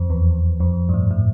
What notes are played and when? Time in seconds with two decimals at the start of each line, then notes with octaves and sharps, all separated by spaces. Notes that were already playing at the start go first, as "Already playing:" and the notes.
Already playing: F2
0.10 E2
0.60 F2
0.89 G2
0.94 A2
1.11 A2